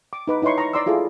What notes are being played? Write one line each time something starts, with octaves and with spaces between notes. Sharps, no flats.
D6
D#4 B4 D6
D#4 E4 B4 C#5 C6 C#6
A#5 C#6
D5 A#5 C6 D6 E6
E4 F4 G#4 A4